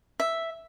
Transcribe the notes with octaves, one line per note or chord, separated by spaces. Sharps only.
E5